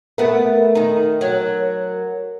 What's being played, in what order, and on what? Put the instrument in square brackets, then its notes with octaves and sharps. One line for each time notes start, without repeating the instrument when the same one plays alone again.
[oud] A3 B3 [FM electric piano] A#4
[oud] D#3 D#4
F#3